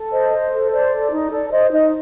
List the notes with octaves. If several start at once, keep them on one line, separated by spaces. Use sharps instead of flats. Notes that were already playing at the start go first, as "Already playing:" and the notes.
Already playing: A4
C5 D#5
C5
A4
C5 D5
A4
D#4
A4 D5
C5 D#5
D#4 D#5